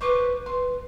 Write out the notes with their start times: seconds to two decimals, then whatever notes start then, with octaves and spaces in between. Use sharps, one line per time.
0.01 B4 C5 C#6 D6
0.46 B4 C6